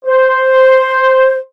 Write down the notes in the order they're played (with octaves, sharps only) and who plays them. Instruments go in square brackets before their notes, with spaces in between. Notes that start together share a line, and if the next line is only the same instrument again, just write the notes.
[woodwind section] C5